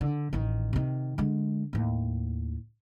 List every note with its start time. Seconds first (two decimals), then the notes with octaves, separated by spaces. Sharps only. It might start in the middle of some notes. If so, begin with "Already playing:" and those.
0.01 D3
0.33 A1 D#3
0.73 C3 D#3
1.18 D3 G#3
1.73 D#2 A2